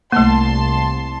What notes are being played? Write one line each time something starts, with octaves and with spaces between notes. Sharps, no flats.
C2 A3 A#3 A5 C6